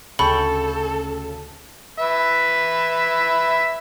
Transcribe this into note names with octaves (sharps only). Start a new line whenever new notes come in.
D2 C#3 A4 G5 A5 B5 C#6
B4 E5